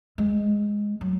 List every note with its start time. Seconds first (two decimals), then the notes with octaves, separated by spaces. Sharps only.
0.18 G#3
1.01 F#3